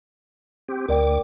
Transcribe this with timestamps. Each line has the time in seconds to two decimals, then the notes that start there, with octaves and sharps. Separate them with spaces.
0.68 C4 G4
0.88 D2 A#4 D5 G5 D6